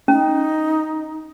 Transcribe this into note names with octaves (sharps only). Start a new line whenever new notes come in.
C#4 D#4